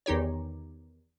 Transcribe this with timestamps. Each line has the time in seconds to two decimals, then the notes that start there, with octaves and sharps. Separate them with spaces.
0.06 E2 D#3 D#4 G4 C#5